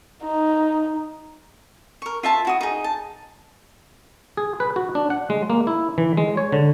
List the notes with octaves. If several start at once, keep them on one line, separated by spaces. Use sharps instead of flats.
D#4
A#4 C#6
F4 E5 A5
E4 F#4 D#6
D#4 G#4
A5
G#4
B4
F#4
D4
F#5
G#3
A#3
E4
E3
G#3
C#5
D3